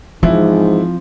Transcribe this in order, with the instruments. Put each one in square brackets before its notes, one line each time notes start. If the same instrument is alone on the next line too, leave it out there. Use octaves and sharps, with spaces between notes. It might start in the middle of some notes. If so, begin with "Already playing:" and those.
[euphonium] G#2 [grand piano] E3 E4 [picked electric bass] F3 [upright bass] C4